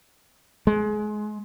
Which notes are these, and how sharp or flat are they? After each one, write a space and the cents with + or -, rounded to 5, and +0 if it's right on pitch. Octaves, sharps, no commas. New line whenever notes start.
G#3 +25